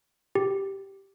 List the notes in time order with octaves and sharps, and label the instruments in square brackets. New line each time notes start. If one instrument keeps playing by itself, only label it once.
[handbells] G4